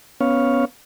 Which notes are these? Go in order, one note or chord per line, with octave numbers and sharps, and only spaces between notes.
B3 C#4 C#5 F5